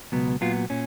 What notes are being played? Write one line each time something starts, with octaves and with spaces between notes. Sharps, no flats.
C#2 B2 F#3 B3
A#2 F#3 B3 F4
A#2 C#4